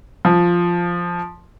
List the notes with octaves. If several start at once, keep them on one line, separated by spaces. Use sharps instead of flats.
F3